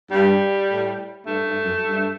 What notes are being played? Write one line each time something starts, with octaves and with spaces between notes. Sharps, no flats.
G2 G3
A2
G2 A3
G2
F#2
G2